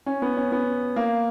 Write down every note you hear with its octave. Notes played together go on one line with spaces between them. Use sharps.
C#4
B3
C#4
B3
A#3